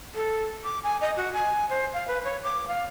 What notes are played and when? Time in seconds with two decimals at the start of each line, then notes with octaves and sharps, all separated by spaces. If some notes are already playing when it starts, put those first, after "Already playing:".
0.15 A4
0.64 D6
0.84 G#5
1.01 D#5
1.17 F#4
1.33 G#5
1.69 C5
1.93 F5
2.08 B4
2.24 C#5
2.44 D6
2.68 F5